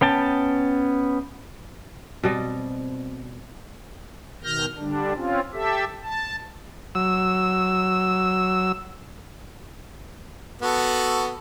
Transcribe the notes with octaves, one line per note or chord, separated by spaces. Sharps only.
B3 C#4 G5 A5
B2 G3 C4 D#5
B2 D#3 F6 G6 A#6
D3 G3 D4
C4 C#4 F4
G4 A4 E5
A5
F#3 E6
B3 F#4 A4